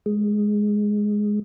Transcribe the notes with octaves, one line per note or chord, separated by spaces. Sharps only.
G#3